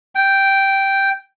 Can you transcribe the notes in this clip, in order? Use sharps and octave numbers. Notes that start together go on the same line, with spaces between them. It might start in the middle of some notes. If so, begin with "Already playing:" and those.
G5